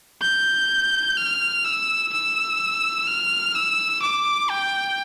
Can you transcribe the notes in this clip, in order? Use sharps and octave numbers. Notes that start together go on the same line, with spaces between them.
G6
F6
E6
E6
F6
E6
D6
G5